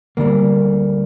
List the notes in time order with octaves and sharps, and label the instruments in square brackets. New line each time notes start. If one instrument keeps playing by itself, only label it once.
[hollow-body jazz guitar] D2 D3 G3 A#3